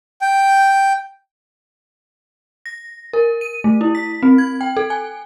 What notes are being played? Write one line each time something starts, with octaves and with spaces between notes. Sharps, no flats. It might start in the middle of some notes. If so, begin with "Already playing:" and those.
G5
A#6
A#4
D#7
A3
E4
B6
C4
G#6
G5
A4
G#5